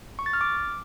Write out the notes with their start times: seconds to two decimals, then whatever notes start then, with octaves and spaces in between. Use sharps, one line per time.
0.19 C#6
0.26 A6
0.33 F6
0.41 D6